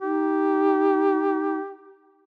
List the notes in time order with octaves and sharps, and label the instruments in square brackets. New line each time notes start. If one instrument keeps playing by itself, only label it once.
[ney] D#4 [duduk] G4